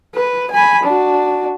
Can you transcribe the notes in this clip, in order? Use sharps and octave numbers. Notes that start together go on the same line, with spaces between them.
B4
G#5 B5
D4 F#4